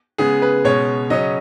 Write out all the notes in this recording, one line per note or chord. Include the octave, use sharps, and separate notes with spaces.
C#3 G#3 B3 G#4
B4
B2 G#3 C#4 C#5
C#3 F#3 C#4 D#5